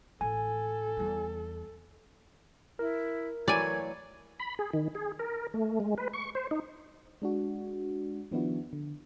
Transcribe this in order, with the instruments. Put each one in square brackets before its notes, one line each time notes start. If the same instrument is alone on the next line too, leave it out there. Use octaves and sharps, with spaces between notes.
[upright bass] A1 [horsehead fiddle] A4 [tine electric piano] G#5
[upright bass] E2 G3
[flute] E4 [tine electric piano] A#4
[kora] E3 F#3 A3 [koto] D5 G#5 [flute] G#6
[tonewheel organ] B5
G#4
D#3
G#4
A#4
A3
G#3
B4
C#6
C5
D#4
[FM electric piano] G#3 D4 F#4
D#3 F3 B3 D4 E4 F#4
D3